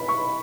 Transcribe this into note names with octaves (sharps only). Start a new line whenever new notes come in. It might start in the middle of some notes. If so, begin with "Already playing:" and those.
Already playing: B5
C#6